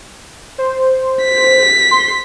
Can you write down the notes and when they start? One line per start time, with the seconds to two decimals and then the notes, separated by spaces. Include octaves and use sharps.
0.58 C5
1.24 B6
1.91 C6